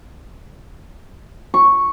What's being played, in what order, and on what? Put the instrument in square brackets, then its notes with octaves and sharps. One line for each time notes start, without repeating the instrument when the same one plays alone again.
[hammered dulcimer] C#6